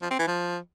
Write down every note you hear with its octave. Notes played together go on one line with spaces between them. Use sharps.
F3
C4
E3
F3